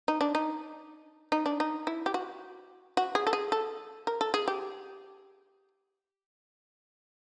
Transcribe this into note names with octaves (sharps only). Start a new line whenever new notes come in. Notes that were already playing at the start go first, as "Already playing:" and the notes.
D#4
D4
D#4
D#4
D4
D#4
E4
G4
F#4
F#4
G#4
A4
G#4
A4
A#4
A4
G#4
G4